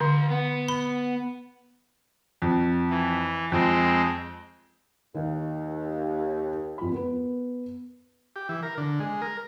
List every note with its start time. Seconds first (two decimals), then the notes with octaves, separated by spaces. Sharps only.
0.01 D3 E3 C6
0.31 B3
0.68 B5
2.42 F2
2.90 E3
3.52 F2 G#3 C4
5.15 D#2 D#3
6.78 F2 B5
6.92 B3 A#4 B4
8.36 G4
8.49 E3
8.63 A#4
8.78 D3
9.00 G#3
9.22 A#4